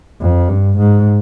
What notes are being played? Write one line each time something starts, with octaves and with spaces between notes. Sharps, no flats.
F2
G2
G#2